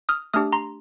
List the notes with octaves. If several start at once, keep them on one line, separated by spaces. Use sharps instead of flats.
D#6 F6
A3 D4 G4 D#6 F6
A#5 C6